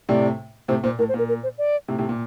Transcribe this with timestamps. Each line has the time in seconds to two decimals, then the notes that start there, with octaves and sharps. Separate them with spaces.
0.09 A2 C3 D5
0.68 A2 C3 C5
0.84 A#2 C5
0.99 A2 A#4
1.09 C5
1.14 A#2 A#4
1.29 A#4
1.43 C5
1.58 D5
1.88 A2 C3
1.99 A2 C3
2.09 A#2